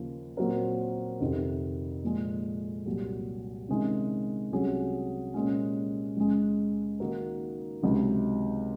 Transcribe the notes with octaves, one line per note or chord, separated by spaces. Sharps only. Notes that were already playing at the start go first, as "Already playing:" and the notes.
Already playing: D#2 C#3 F3 A#3
A#2 F#3 C4 F#4 A#4
F2 C3 D#3
A#2 F3 G#3
C2 A#2 F#3
C3 D#3 G#3 C#4
C2 C3 F#3 C#4 G#4
A#2 G#3 C#4
C#2 C#3 G#3
D#3 A#3 D#4 F#4 A#4
C#2 C3 D#3 F#3